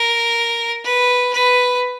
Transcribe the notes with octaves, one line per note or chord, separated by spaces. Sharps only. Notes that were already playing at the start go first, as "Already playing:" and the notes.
Already playing: A#4
B4
B4